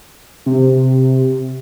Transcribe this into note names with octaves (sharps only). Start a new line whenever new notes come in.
C3